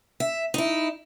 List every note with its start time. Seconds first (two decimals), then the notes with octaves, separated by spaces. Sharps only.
0.20 E5
0.54 D#4 E4